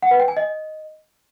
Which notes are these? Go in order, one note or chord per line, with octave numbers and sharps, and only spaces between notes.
F#5
B4
G5
G#5
D#5